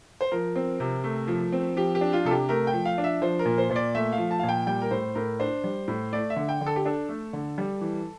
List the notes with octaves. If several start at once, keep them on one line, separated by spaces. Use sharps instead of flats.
C5
F3 A#4
C4
C3
A3
F3
C4
F3 G4
G4
D4
F4
C3 A4
G4
A3 A#4
G5
F3
F5
D4
E5
F3 C5
A#4
A#2
C5
A#2 C5
D5
A3 E5
F5
F3
A5
A#2 F5
G5
G3 G5
A#4
A2 C5
A2 A#4
D4 C5
G3
A2
A3 D5
E5
D3
G5
D3
A4
G4
D4 A4
A3
D3
G3
E3